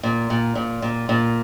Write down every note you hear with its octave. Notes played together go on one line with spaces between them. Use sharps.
A#2
A#2
A#2
A#2
A#2